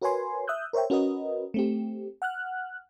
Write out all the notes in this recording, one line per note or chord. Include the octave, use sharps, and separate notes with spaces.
F#4 A#4 B4 C#5 G#5 C6
E5 D#6 E6 F#6 G6
A#4 C5 C#5 E5 G5
C#4 F#4 A#4 B4 D#5
A3 C4 G4
F#5 F6 F#6